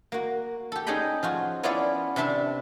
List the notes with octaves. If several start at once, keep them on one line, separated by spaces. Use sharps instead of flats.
A#3 F#4
G4 A4
C#4 D#4 G#4 D#5 G5 B5
F3 F4 F#4
B3 C#4 E4 F4 D5 F5
C3 D4 B4 E5 A5 C6